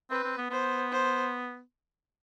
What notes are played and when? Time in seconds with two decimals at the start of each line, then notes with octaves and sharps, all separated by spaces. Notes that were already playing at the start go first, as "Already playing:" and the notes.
0.10 C4 B4
0.24 C4
0.38 B3
0.51 B3 C5
0.92 C5